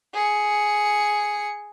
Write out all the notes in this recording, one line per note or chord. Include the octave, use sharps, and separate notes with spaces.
G#4 C#7